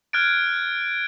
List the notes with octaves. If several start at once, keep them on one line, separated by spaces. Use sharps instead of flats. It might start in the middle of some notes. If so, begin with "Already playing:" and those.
F6 F#6 G#6 A6 D7